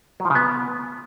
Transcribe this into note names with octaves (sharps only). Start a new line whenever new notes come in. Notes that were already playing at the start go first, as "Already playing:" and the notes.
F#3
F3
C#3
B3